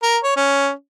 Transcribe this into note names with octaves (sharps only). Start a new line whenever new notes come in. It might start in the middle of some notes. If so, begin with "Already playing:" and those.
A#4
C#5
C#4